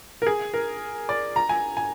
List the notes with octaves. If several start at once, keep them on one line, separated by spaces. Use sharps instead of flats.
A#4
G#4
A#4
D5
A#5
G#5
G#5